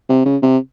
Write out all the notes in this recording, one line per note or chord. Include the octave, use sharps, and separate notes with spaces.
C3
C#3
C3